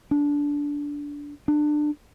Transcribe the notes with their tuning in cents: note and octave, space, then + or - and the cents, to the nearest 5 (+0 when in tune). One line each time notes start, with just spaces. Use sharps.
D4 -15
D4 +25